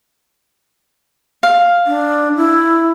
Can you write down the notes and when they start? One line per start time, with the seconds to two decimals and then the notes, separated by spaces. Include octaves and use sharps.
1.43 F5
1.87 D4
2.36 E4